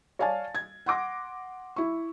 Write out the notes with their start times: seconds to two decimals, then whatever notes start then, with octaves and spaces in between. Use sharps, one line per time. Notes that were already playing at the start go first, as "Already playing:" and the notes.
0.19 C#5 D5 F5 G#5 A5 A6
0.55 G#6
0.86 F#5 C6 D6 A#6
1.76 E4 C#6